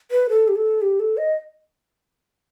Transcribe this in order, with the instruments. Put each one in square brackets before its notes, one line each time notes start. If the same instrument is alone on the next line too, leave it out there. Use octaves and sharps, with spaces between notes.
[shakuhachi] B4
A4
G4
A4
G4
A4
D#5